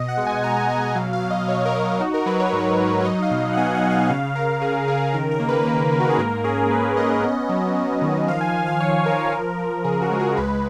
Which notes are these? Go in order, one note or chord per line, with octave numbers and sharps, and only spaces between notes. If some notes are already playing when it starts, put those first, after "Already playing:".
Already playing: B2 D#5
F#5
G#3
G#5
G#3 A#5
G#5
B2 F#5
G#5
F#3 F5
F5
B2
D#5
F#3 C#5
A#4
F#3
A#4
D#4 F#4
A#4
F#3 B4
C#5
G#2
F#3
C#5
D#4 D#5
F5
B2
F#5
B3 G#5
F#5
B3
F5
C#3 F5
C#3 A#4
C#3 G#4
C#3 G#4
D#3 A#4
A#4
A#3
B4
A#3
A#3
F#4
G#4
G#2 A#4
C#4 G#4
A#3 B4
C#4 D#5
B3
F#3
F#3
D#3
F3 F5
G#5
F3
F5
F3 C#5
F3 A#4
F3
F3
C#3 G#4
F#4
G#3
G#4
C#2 B4